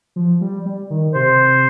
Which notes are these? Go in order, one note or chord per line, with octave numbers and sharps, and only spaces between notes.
F3
G3
G3
D#3
C3 C5